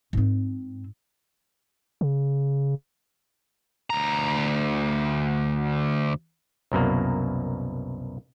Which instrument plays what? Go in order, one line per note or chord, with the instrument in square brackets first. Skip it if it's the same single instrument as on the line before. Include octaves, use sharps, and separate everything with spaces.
[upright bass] G#2 C4
[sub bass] C#3
[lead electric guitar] D2 A#5
[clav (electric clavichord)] C2 F#2 B2 A#3